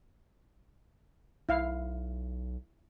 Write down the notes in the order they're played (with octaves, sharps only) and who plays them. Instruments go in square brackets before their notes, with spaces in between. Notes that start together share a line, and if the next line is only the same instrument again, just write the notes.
[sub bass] B1 [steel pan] E4 F5